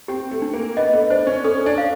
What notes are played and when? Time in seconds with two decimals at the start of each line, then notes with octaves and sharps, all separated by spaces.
0.08 C4 G4
0.31 A3
0.42 D4
0.54 A#3
0.77 B3 D#5
0.93 A3
1.10 D4 C5
1.27 C#4
1.44 C#4 A4
1.66 D4
1.78 F5